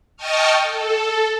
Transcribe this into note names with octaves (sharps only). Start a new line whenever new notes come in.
D#5 G5 A5 C#6 D#6 F6
A4